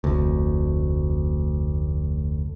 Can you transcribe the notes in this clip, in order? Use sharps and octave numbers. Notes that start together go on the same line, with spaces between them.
F1 D2